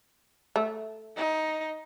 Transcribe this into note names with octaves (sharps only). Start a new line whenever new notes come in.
A3
D#4